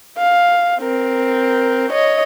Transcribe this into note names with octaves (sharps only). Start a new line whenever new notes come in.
F5
C4 A#4
C#5 D#5